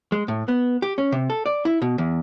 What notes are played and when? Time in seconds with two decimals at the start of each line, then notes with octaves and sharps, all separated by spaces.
0.12 G#3
0.28 A2
0.48 B3
0.82 G4
0.98 C#4
1.12 C3
1.30 A4
1.46 D5
1.65 E4
1.82 B2
1.98 E2